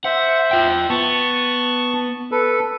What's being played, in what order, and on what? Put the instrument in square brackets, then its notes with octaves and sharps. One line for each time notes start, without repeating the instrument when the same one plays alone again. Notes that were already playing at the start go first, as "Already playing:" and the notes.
[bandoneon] C5 E5 [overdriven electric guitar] F#5
[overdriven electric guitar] F4 G5
[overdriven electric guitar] B3 [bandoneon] A5 C#6
[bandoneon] A4 B4